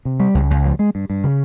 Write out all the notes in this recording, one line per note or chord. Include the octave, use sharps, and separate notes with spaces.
C3
G3
C#2
C#2
F3
G#3
G2
G2
C#3